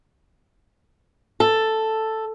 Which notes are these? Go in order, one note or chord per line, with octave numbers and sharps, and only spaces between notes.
A4